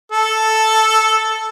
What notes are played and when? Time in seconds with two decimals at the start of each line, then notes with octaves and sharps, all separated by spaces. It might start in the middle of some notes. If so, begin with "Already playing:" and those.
0.12 A4